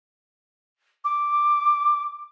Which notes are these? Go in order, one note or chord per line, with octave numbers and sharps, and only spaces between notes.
D6